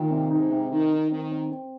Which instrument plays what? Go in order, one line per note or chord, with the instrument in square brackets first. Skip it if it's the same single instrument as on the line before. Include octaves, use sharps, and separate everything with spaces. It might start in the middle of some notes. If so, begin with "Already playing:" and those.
Already playing: [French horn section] A#2 [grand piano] D#3
[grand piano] C3
[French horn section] G#2 [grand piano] D#4
[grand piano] C3
[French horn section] D#3 [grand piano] D#4
[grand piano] D#4
[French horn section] D#3 [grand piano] C4
[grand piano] C4
C4